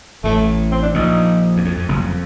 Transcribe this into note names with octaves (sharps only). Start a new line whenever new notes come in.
A1 A2 A3
C4
D4
A#1 A#2 D#4
E2
F2
F2
F#1 F#2
F2